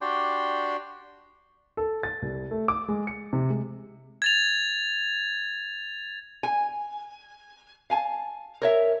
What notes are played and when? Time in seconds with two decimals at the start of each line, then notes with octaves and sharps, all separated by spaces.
0.01 D4 F#4 G4 D5 G5 C6
1.77 A4
2.03 A6
2.22 C2
2.51 A3
2.68 D6
2.88 G#3
3.07 C#7
3.33 C3
3.50 G#3
4.22 G#6 A6 F7
6.43 G#5
7.90 F5 G#5 A5
8.62 A#4 C#5 E5